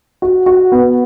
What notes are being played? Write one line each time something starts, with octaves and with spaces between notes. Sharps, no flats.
F#4
F#4
B3